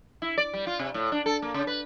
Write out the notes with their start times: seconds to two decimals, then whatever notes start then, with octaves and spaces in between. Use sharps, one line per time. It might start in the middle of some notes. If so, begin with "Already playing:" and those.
0.22 E4
0.38 D5
0.54 G3
0.67 F4
0.79 C3
0.94 A2
1.12 D4
1.26 A4
1.42 A#3
1.54 C#3
1.67 B4